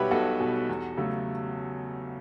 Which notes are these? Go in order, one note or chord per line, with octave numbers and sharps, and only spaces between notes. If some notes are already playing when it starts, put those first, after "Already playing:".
Already playing: B1 B2 G3 G4 B4 C#5 E5 F#5
B1 F#4 A4
B2 G3
E2
C#3 F#3 A3